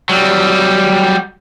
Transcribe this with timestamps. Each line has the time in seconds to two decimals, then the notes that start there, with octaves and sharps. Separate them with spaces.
0.09 F#3 G3